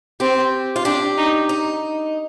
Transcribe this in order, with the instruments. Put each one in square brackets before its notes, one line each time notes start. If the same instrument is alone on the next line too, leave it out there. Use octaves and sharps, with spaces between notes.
[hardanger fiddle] C4 [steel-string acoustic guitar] G4
[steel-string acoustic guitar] F4
[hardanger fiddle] D4 [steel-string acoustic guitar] G4
[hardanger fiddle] D#4
[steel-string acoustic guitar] D#4